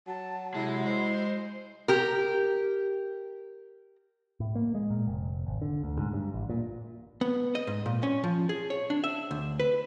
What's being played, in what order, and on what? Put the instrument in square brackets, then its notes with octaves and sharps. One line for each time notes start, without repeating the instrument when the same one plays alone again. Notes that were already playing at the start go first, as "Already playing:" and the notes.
[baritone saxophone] F#3 [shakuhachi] A5
[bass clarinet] C3 [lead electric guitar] G#3 [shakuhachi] E4
[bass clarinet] G#3 [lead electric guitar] C5
[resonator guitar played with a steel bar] G4 A#4
[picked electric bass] A2
A#3
G#3
A#2
F1
G#1
D3
D2
G#2
G2
A1
A#2
[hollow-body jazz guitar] B3
D#5
G#2
A#2
C#4
F3
G#4
C#5
D4
E5
D2
B4